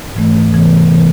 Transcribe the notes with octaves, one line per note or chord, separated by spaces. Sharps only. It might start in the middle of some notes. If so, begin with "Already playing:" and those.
G#2 E3 A3
C3 E3 B3
C3 E3 B3